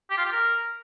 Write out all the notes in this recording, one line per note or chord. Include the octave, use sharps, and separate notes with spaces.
G4
F4
G4
A#4